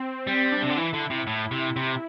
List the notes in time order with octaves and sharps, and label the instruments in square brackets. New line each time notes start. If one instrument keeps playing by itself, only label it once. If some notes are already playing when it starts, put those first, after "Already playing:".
Already playing: [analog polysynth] C4
[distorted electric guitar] G3 [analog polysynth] C4
[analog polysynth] D4
[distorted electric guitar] C3
D3
[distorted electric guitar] E3 [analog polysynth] E4
[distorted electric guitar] D3
C3
A2
C3
C3